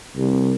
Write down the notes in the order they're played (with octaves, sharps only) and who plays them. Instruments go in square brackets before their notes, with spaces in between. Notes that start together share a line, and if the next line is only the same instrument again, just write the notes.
[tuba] C2